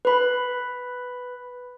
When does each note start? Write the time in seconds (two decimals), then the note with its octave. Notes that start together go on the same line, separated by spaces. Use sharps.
0.05 B4 B5